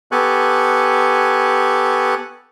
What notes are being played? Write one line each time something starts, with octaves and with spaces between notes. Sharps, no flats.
B3 G4 A4 G#5 C#6 F#6